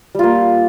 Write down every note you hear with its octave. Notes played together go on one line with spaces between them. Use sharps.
G3 A#3 F4